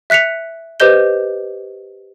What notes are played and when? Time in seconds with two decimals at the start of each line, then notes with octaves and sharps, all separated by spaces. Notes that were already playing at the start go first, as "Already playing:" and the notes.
0.10 E5 F#6 B6 C#7 F7
0.80 G4 B4 C5 D#5 G6 G7